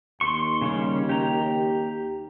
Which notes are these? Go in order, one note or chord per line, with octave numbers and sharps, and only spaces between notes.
D#2 C6 C#6
C#3 G3 C#4
G4 A#5